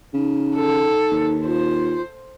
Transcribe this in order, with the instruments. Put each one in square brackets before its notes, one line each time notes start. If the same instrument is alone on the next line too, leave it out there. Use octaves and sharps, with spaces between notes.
[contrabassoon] C#3 [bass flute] D#4
[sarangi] A4
[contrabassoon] D#2
[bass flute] F4 [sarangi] C5